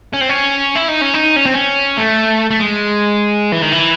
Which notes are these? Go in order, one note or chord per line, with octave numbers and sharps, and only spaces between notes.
C#4
C4
C#4
E4
D#4
C#4
D#4
C#4
C4
C#4
A3
A3
G#3
E3
D#3
E3